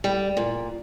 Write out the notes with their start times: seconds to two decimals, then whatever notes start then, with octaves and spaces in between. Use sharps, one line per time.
0.04 G3
0.37 A#2